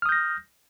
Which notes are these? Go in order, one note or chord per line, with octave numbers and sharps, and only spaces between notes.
D#6 F6 G6 A#6